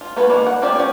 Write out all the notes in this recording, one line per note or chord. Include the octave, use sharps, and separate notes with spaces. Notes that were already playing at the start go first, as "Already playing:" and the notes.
F4
B3 F4 F#4 B4 C#5
D#3 E3 G3 A#3
F#5
C4 C#4 F4 G4 D5
C#4 C#5 D5 G5